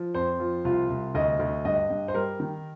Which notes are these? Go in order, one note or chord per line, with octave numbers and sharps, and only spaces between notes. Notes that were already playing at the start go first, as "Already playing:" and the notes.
Already playing: F3
F2 C5
F3
C2 F4
C2
D2 D#5
D2
G2 D#5
G2
C5
G3 A#4
D#3